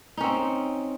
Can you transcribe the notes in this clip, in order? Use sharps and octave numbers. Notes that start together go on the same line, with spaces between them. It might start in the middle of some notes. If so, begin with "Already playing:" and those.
C4 C#4 D#4